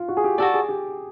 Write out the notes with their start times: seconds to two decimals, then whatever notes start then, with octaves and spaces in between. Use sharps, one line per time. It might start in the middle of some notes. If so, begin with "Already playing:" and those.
Already playing: F4
0.08 F#4
0.17 G#4
0.24 G4
0.38 F#4 G4 A4 D5
0.54 G#4
0.69 G4